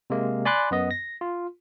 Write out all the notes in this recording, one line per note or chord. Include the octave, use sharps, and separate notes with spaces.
C3 G#3 A#3
D5 G#5 B5 C6 D6 F#6
F#2 B3 D#5
A#6
F4